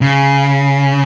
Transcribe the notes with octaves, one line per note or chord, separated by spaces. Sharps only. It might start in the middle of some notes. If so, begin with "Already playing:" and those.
C#3